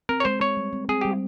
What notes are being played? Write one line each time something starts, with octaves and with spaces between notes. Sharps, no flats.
C4 A#4
C#5
G#3 C5
C4 C#5
G3
C4
C4 G#4
G3 G4